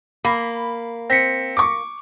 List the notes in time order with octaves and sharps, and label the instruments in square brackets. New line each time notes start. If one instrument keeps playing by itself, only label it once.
[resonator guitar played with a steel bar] A#3 [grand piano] B5
[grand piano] C4 [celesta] A#6 B6 C#7
[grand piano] C#6 D6